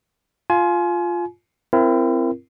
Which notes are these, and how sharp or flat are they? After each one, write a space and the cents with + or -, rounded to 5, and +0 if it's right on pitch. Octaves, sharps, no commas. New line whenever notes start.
F4 +0 G#5 +30
C4 +0 E4 +35 A#4 +0